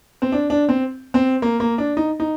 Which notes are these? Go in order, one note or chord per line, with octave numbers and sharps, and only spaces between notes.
C4
D4
D4
C4
C4
A#3
A#3
D4
D#4
D#4